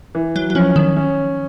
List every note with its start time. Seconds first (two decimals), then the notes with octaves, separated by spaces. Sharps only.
0.15 E3
0.36 F#3
0.50 F#3
0.55 F3 C#4
0.76 D#3
0.96 C#4